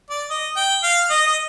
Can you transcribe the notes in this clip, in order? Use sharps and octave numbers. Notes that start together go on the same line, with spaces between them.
D5
D#5
G5
F5
D#5
D#5